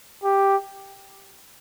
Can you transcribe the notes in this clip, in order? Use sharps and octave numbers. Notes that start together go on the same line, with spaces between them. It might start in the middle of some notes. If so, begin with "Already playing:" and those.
G4